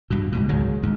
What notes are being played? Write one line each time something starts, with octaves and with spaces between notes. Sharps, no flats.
G2 B2
C#2 G#2 B2
C#2 D#3 F#3 G#3
D2 G#2